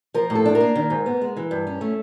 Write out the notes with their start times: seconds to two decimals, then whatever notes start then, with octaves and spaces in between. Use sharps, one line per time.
0.14 F3 A#4
0.30 A2
0.35 A4
0.46 D4
0.55 A#4
0.60 A#3
0.75 D#3
0.90 G#2
1.06 B3
1.21 G#3
1.37 E3
1.51 G2
1.67 C#4
1.81 A3